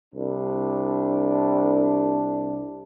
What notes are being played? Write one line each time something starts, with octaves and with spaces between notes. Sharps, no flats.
C2 D4